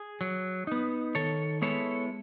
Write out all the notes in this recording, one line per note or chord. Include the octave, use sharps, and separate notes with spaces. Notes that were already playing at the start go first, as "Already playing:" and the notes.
Already playing: G#4
F#3
B3 D#4
D#3 A4 C#5
G#3 B3 E4 A4 C#5